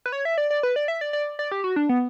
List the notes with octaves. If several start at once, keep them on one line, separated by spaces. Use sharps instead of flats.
B4
C#5
E5
D5
D5
B4
D5
E5
D5
D5
D5
G4
F#4
D4
B3